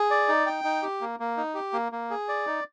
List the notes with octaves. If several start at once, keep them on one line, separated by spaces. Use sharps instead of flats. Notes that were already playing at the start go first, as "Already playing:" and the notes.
Already playing: G#4
D5
D#4
G5
D#4
G4
A#3
A#3
D#4
G4
A#3
A#3
G#4
D5
D#4